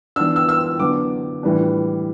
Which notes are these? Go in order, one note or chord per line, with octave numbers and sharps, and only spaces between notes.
E3 B3 D4 E6
E6
E6
D3 F#3 B3 D4 D6
A2 E3 G3 D4